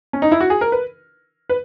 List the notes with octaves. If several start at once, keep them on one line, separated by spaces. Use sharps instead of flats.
C#4
D#4
E4
F#4
G#4
A#4
B4
B4